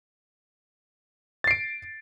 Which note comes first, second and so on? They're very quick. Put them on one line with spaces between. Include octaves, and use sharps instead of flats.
A6 C7 D7